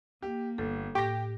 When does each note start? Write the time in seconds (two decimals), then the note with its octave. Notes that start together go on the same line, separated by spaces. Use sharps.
0.22 A#3 G4
0.58 G1 A4
0.95 A2 G4 G5 A#6